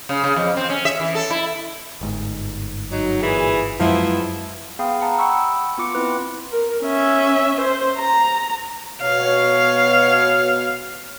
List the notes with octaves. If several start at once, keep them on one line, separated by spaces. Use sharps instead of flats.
C#3
C#3
F2
C4
C#4
E5
E3
A4
E4
G1 G#2
F#3 D#4
A#2 E3 G#4
F#2 F3 F#3 G#3 B3 E4
B3 G#4 F5 G5 B5 D#6
F#5 A5 A#5 D#6
F#5 G5 B5 C#6 E6
B3 F4 D6 C#7
B3 C4 E4 B4
A#4
C#4 E5
C5
A#5
B2 B3 C#5 F5